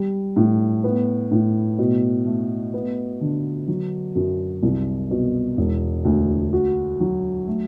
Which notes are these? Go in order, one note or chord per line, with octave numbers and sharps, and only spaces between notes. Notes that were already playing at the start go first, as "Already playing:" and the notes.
Already playing: G3
A2
B3
A2
B2
A3
B3
D3
F#3
F#2
C2
B2
E1
D2
F#4
F#3
A3